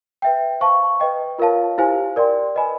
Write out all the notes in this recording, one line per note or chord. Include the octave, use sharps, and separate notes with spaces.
B4 E5 G5
C5 F5 A5 C#6
B4 D#5 G5
F4 A#4 C#5 F5 A5
E4 G4 C5 F5 G#5
A#4 D5 G5 C6
B4 D#5 G#5 B5